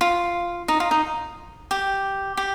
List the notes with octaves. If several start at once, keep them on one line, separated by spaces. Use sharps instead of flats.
F4
D#4
F4
D#4
G4
G4